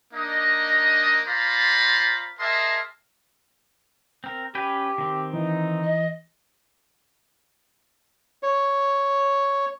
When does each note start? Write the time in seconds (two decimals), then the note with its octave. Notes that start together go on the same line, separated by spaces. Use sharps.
0.13 A#3 D4 D#4 D#5
1.27 F4 C5 D5 F5 A#5 B5
2.40 G#4 A#4 D#5 E5 A5 C6
4.24 C4 A#4
4.55 C#4 G4 B4 G5
4.98 D#3 C4
5.34 E3 D#4
5.83 D#5
8.43 C#5